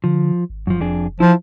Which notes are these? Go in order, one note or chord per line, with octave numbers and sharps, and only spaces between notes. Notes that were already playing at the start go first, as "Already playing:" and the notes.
D3 F3
G#1
F1 F#2 F3
F2 D4 G#4
F3 E4 F4